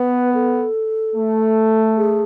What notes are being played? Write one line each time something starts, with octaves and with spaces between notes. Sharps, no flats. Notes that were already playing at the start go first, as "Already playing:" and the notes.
Already playing: B3 B4
A4
A3
G#4